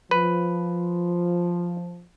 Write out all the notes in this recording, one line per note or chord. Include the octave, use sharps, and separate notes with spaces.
F3 B4